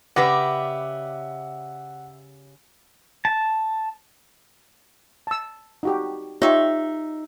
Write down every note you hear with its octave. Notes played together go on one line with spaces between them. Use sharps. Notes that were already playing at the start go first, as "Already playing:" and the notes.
C#3 G4 B4 D5 E5 F#5 A#6
A5
A5 E6
D#4 F#4 G4
D#4 F4 G4 C#5 E5